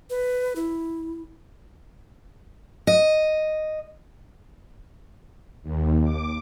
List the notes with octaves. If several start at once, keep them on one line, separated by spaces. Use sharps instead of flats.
B4
E4
D#5
D#2
D6